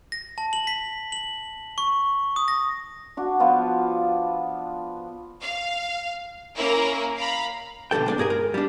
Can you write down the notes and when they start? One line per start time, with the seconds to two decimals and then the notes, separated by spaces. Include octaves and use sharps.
0.12 A#6
0.38 A5
0.53 F#7
0.67 B6
1.12 F#7
1.78 C#6
2.36 D#6
2.48 A#6
3.17 D4 F#4
3.40 F3 B3 F4
5.41 F5
6.56 A#3 C#4 E4 A#4
7.16 F5 A#5 B5
7.91 B1 D3 F#3 A4 G5
8.06 G#3 C4 D4
8.18 G2 G#4 A#4 G#5
8.30 A#4
8.54 G3 D4